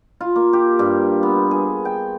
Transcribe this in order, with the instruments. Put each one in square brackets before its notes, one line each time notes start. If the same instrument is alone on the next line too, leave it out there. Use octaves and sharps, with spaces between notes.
[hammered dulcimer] F4
A#3
G4
G2
B3
G#4
G5